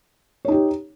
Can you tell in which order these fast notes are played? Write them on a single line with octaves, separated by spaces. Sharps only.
C#5 D#4 G4